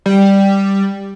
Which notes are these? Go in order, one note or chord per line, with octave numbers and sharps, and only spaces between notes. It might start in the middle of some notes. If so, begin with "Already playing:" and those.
G3